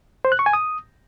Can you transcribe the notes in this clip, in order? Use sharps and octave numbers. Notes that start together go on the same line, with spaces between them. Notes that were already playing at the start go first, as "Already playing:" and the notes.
C5
F#6
C#6
G#5
D#6